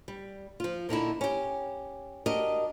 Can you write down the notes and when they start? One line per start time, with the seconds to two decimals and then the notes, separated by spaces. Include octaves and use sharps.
0.08 G3
0.60 F3 F4
0.89 A#2 D3 D#4 E4
1.21 C#4 G4
2.26 D4 F#4 G4 A#4 D#5